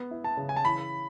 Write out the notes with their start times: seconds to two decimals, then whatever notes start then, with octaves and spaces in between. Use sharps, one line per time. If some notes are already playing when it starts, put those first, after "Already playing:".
Already playing: B3
0.11 E4
0.24 A5
0.37 C#3
0.49 G#5
0.56 A5
0.64 E3 B5